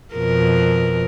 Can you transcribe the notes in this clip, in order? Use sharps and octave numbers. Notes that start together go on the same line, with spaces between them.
F2 B2 A#4